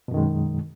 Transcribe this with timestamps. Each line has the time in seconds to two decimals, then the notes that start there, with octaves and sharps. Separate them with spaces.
0.08 B2
0.11 F#2
0.14 D#3
0.17 G#3